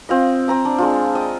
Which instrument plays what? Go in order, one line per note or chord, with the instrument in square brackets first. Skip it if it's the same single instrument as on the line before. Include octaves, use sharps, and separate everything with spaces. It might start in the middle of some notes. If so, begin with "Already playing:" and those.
[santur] C4 F4 D#5
C4 A#5 D#6
D4
G#3 D4 F4
D#5 G5